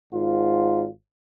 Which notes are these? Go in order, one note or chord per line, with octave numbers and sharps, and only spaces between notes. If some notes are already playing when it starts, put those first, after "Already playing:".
G#1 G#2 F4